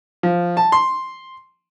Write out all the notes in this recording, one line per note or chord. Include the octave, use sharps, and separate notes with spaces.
F3
A5
C6